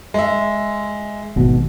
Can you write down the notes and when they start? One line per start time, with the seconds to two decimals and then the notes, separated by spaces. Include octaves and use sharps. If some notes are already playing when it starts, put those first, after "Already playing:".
0.14 G#3 E5
1.36 G#1 B2